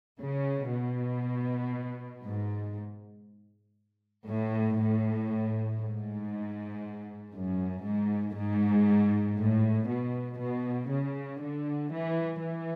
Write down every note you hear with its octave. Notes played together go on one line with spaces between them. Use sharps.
C#3
B2
G#2
A2
A2
G#2
F#2
G#2
G#2
A2
B2
B2
C#3
D3
E3
E3